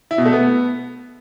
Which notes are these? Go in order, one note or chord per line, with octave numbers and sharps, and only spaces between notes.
E4
B2
A3
B3